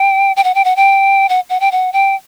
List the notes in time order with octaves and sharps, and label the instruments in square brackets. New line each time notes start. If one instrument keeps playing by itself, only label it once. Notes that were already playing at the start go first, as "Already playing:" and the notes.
Already playing: [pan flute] G5
G5
F#5
G5
F#5
G5
F#5
F#5
G5
F#5
G5